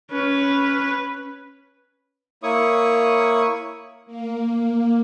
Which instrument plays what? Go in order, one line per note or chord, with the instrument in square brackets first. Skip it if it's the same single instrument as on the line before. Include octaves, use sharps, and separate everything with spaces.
[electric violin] C#4 B4
[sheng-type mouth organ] A#3 E4 C#5 C#6 D#6
[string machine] A#3